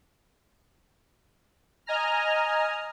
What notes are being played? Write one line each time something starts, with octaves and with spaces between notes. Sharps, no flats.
D#5 G#5 A#5 F6